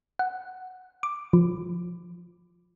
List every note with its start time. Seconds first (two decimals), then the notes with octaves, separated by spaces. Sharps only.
0.19 F#5
1.03 D6
1.33 F3